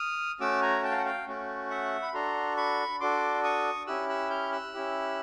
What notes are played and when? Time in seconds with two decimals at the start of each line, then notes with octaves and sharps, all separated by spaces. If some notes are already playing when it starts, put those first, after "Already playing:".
Already playing: D#6 F6
0.40 A3 C#4 F#4 D6 E6
0.62 G#5 A#5
0.83 G5 A5
0.91 F5
0.98 F#5
1.05 F5 G5
1.28 A3 C#4 F#4
1.70 E5 F#5
2.02 B5
2.14 D4 F#4 A4 A#5 C6
2.57 B5 C#6
3.00 D4 F#4 A4 C6 D6
3.44 C#6 D#6
3.87 C#4 E4 G4 E6 F#6
4.09 E6 F#6
4.30 F6 G6
4.52 E6 F#6
4.74 C#4 E4 G4